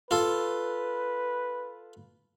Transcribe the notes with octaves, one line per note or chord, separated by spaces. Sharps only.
F4 A4 B4